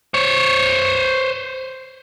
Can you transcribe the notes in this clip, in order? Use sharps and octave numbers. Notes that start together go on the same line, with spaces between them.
C5 C#5